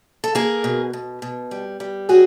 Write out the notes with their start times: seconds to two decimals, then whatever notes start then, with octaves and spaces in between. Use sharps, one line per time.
0.24 A4
0.35 A#3 G#4 A#4
0.64 B2
0.93 B2
1.22 B2
1.51 G3
1.80 G3
2.09 F#3 F#4 G#4